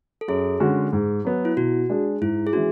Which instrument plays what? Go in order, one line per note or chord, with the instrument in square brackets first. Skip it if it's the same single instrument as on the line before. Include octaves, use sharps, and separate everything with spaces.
[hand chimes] A4
[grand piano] F#2 [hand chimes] G#4
[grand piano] D3 G#3 C#4 F#4
G#2
F#3 B3
[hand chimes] E4
[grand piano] B2 [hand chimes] F#4
[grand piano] G#3 D4 G#4
[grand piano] G#2 [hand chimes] E4
[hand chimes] G#4
[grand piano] E3 G#3 C#4 [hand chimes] F#4